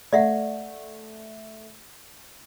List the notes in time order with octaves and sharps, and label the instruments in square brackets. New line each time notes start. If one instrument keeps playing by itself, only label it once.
[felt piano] A3 [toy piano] D5 E5 F#5